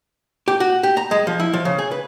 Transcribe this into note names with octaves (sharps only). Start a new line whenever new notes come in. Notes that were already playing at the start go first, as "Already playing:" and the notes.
G4
F#4
G4
A#5
G#3
F3
E4
F3
C#3
G#4
B4